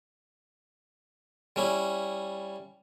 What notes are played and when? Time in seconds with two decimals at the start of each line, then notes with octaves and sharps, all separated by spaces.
1.56 G3 C#4 E4